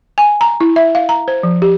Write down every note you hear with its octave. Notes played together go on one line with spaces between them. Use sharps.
G#5
A#5
E4
E5
F5
A#5
C5
F3
G4